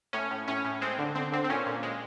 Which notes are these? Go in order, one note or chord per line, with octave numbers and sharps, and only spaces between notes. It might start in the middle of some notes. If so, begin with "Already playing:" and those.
A2 C#4
A2
A2 C#4
A2
G#3 C4
D3
D3 C4
D3 C4
C4
A#2 C#4
A#2
G#3